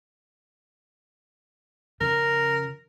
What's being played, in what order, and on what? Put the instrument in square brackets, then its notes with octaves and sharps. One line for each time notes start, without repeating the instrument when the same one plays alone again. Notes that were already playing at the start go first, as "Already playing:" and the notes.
[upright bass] F2 C#3 [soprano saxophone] A#4